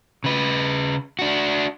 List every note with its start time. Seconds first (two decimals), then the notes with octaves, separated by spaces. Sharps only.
0.24 C#3 B4
1.19 D4 F#4